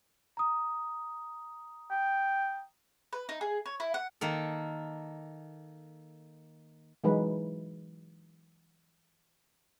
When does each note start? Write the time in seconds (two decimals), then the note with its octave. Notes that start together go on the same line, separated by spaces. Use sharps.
0.37 A#5 D#6
1.91 G5
3.13 B4
3.29 D#4
3.41 G#4
3.66 C#5
3.80 E4
3.94 F#5
4.21 D#3 A#3 A4
7.04 E3 F#3 G#3 D#4 B4